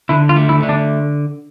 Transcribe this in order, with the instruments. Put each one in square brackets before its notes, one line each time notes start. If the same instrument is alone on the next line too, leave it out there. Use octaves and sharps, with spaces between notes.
[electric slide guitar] D3 [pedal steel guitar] E4
[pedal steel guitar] F4
[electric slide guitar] A3
[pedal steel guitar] E4
[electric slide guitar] D3
[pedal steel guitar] D4